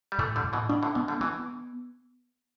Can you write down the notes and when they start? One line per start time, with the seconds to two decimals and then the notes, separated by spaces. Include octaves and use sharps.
0.12 G3
0.18 A2 E3 A3
0.36 D3 G3
0.44 A2
0.53 B2 E3
0.69 B2 D4
0.83 A2 D3
0.95 B2 E3 B3
1.08 D3 G3
1.21 B2 E3 B3